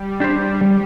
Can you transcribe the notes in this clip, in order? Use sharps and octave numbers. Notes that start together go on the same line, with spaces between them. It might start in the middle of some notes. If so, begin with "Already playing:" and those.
Already playing: G3
D4 G4 C5
G3